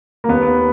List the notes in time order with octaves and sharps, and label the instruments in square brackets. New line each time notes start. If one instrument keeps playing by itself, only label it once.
[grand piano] A#3
D#2 B3